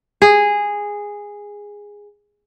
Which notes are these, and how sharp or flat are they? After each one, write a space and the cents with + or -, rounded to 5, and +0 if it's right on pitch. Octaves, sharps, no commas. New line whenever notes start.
G#4 -10